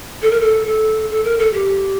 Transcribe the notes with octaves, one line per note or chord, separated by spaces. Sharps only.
A4
A#4
A4
A4
A4
A#4
A4
G4